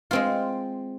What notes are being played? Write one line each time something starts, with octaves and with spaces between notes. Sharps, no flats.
G#3 C4 F4